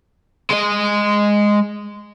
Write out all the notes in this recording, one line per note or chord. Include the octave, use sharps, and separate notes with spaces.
G#3 D#5